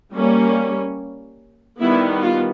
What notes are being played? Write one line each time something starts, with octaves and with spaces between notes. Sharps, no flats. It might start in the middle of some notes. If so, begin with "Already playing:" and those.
G3 A#3 C#4
D#3 G3 B3 E4
F4